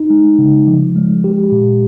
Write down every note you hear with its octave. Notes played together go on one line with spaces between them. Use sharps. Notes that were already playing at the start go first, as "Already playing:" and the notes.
Already playing: D#4
G#3
C#3
F3
G#3
G4
A#2